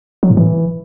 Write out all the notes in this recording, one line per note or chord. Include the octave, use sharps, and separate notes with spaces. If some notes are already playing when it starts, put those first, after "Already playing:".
F#3
A2
E3